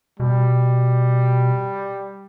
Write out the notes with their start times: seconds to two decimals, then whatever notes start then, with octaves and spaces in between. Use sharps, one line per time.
0.20 B2 G3